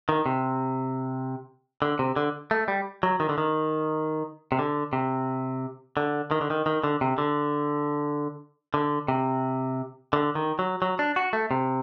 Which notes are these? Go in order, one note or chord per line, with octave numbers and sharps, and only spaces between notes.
D#3
C3
D3
C3
D3
A3
G3
F#3
D#3
D3
D#3
C3
D3
C3
D3
D#3
D3
D#3
D#3
D3
C3
D3
D3
C3
D3
D#3
F#3
F#3
D4
F#4
A3
C3